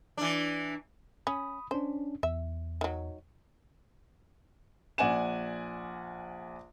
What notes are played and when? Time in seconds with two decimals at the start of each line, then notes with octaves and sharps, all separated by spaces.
0.17 E3 D4
1.27 C#4 B5 D#6
1.71 C#4 D4 C5
2.23 E2 E5
2.81 D#3 F#3
4.98 A#1 D5 F#5 G#5 E7